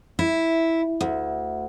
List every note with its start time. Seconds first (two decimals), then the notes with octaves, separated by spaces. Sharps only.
0.19 E4
1.01 D2